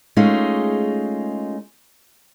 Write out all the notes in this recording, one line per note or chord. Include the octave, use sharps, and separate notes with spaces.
G#3 A3 C#4 D#4 F4 G#4